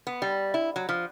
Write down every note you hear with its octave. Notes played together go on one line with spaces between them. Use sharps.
B3
G3
E4
F#3
F3